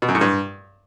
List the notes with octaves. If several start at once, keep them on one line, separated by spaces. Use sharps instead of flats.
B2
F#2
A2
G2